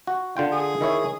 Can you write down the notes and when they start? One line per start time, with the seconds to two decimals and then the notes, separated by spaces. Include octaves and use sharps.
0.07 F#4
0.37 D3 F4 G5
0.52 G#4
0.81 D#3 E4 C#5